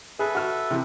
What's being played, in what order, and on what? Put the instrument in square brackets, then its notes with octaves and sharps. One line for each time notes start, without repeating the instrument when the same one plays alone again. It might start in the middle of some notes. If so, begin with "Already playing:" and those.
[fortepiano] G#4 [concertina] A4 B4 E5
[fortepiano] F#4 F6
C3 E3 G4